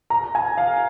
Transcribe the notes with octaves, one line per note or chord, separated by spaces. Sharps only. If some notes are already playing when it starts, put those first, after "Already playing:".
A#5
G#5
F5